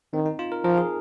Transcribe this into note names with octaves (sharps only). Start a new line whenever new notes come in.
D#3 C4
D#4
F4
A#4
F3 A#4
G#4